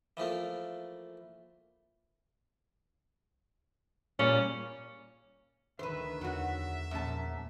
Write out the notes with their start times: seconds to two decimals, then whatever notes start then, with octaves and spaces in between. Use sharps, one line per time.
0.17 E3 F3 A3 A#3
4.19 A#2 G3 A#3 C#4
5.79 D2 D3 D#3 B4 C5 E5
6.21 E2 F#3 F#4
6.91 A#1 F#2 A#3 A5